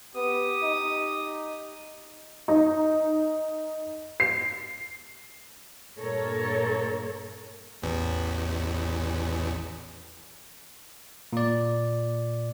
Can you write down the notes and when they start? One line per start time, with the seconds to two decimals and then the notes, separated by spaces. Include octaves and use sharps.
0.15 B3 G4 D#6
0.62 D#4
2.48 D#4
4.20 C7
5.98 G2 A#2 A4 A#4 C#5
7.82 A1 E2
11.33 A#2 D5